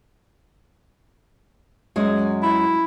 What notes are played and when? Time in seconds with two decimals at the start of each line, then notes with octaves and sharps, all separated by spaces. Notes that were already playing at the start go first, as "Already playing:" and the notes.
1.96 F#2 G#3 D#5
2.42 E4